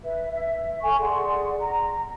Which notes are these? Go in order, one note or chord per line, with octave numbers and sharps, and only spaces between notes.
B4 E5
E5
A4 G#5 C#6
G#4 D5 F#5 C6
A#5